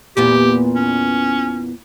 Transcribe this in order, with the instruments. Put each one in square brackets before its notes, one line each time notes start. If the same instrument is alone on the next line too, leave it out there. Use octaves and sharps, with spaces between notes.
[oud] E2 A#2 B3 [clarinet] G4
[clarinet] C#4